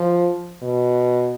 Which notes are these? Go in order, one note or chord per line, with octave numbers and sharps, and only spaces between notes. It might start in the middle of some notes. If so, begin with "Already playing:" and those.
Already playing: F3
B2